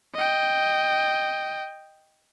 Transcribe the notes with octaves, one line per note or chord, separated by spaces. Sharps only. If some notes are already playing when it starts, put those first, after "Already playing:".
D#5 G5